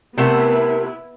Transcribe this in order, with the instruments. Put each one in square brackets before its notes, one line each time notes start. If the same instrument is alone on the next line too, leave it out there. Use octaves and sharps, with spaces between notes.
[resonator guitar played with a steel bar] C3 A3 F#5 [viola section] B3 E4 [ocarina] A#4